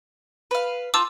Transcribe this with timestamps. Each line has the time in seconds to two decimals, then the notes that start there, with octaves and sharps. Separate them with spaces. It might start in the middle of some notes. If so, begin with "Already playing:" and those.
0.51 B4 F5
0.94 F4 A5 D6 E6 G6